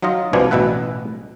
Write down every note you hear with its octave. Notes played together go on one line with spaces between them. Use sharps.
F#3 D#4 F4 D#5
C2 B2 F3 B3 D4 G#5
A1 B2 B4 E5 F#5